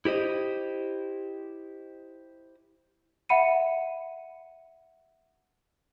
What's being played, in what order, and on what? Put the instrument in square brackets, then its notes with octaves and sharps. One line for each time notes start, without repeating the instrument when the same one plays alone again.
[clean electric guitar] E4 G4 C5 D#5
[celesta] E5 F#5 B5 C#7 D#7